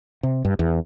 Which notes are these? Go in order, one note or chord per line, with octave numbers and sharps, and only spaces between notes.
C3
G2
E2